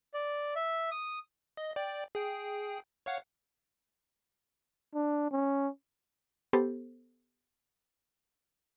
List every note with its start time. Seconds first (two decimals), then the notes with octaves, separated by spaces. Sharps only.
0.14 D5
0.56 E5
0.91 D#6
1.57 D#5
1.76 D5 G5
2.15 G#4 G5
3.06 C#5 F5 F#5
4.95 D4
5.32 C#4
6.53 B3 G4 A4 C5